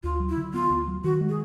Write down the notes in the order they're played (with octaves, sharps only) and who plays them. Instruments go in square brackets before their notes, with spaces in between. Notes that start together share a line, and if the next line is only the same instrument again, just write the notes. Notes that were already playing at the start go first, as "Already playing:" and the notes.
[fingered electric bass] D2 [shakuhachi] F4
[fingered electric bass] F#3
[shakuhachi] E4
[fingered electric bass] D3
[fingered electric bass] B3 [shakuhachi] F4
[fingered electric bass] D2
F#3
[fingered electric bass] D#3 [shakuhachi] F#4
[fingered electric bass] G#3
[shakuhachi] G#4